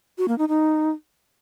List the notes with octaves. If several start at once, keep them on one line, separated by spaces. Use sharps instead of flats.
F#4
A#3
D#4
D#4